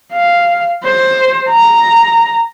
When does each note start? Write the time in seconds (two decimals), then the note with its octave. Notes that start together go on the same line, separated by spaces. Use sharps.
0.13 F5
0.84 C5
1.49 A#5